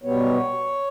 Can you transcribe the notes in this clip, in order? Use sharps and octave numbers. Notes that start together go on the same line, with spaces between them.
B2 G3 B3 C#5